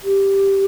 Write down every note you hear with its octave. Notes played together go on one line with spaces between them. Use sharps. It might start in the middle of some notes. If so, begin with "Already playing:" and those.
G4